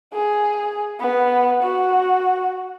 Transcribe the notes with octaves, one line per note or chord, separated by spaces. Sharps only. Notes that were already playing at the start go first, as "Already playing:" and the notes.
G#4
B3
F#4